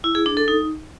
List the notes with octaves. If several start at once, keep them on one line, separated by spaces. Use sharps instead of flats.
E4
G#4
D4
A4
D#4